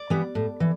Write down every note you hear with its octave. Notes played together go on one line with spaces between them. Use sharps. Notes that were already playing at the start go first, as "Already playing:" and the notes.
Already playing: D5
E3 G3 B3
A2
E3